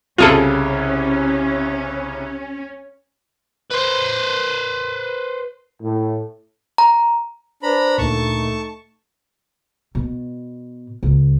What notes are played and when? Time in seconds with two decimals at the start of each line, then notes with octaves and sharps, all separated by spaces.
0.18 C2 C#3 C#4 F4 G#4 A4
3.71 B4 C5
5.82 A2
6.78 A#5
7.63 D4 B4 C5 A#5 B5
7.98 D2 A#2 A3 D#4 A5 C#6
9.95 B2
11.03 C#2